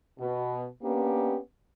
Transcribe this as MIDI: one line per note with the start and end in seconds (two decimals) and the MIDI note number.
0.19 0.66 47
0.83 1.37 58
0.83 1.37 59
0.83 1.37 61
0.83 1.37 62
0.83 1.37 67